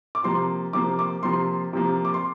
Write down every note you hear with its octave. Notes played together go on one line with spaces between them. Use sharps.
D6
C3 F3 A#3 C6
C3 F3 A#3 D6
D6
C3 F3 A#3 C6
C3 F3 A#3
D6
C6